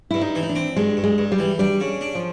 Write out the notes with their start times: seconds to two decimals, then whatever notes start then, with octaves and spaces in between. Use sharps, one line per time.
0.11 G2 E4
0.21 D#4
0.35 E3
0.43 D#4
0.49 D4
0.55 C4
0.76 G2 G#3
0.97 G2
1.04 G#3
1.18 G2
1.32 G3
1.39 E3
1.59 G3 D4
1.80 C#3
2.01 D4
2.15 F3